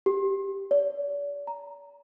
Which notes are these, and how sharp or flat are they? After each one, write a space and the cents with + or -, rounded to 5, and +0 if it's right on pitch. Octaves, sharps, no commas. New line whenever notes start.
G4 +0
D5 -40
A#5 +0